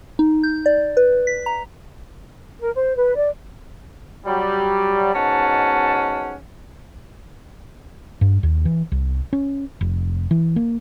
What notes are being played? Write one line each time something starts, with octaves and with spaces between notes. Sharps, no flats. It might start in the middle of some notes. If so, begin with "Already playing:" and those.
D#4
G6
D5
B4
B6
A#5
A#4
C5
B4
D5
F#3 G3
G#2 B2 C#4 F#5 A5
G2
D#2
E3
C2
C#4
F1
E3
A#3